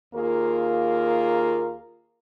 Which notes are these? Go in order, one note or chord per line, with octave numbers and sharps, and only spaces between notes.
D#2 A#3 F4 G#4 A#4